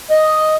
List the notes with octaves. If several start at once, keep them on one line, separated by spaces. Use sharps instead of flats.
D#5